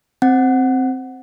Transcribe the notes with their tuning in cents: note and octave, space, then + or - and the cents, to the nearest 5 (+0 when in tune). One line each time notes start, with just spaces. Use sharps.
C4 +0 F#5 +0